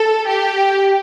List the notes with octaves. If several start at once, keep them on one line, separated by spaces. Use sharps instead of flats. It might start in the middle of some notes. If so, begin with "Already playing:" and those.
Already playing: A4
G4